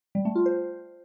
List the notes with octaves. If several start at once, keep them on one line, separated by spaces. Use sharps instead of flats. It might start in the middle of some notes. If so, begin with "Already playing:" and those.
G3
A3
F4
C5